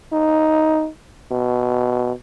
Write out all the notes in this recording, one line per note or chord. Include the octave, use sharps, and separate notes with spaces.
D#4
B2